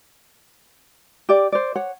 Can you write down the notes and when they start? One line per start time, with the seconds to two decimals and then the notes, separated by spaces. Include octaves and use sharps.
1.29 G4 D5
1.52 C5 D5
1.75 C#5 F#5